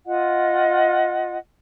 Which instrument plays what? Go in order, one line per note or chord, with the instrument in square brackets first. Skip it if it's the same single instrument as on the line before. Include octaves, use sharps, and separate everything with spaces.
[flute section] F4 D#5 F#5